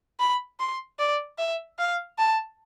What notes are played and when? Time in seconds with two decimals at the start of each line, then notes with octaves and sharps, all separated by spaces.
0.20 B5
0.59 C6
0.99 D5
1.38 E5
1.79 F5
2.18 A5